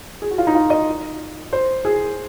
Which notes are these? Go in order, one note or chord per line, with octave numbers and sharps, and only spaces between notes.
G#4
F#4
F4
D#4
F4
D#5
C5
G#4